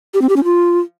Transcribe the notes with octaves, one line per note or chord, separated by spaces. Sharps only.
G4
C4
G4
C#4
F4